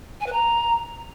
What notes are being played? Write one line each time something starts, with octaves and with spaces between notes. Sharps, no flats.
G#5
B4
A#5